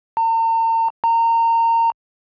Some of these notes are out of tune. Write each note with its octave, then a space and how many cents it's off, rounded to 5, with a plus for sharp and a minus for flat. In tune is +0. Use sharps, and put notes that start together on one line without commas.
A#5 -45
A#5 -25